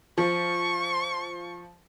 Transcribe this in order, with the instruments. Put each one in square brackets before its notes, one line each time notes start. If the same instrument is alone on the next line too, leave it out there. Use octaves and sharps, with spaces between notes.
[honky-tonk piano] F3 [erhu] C#6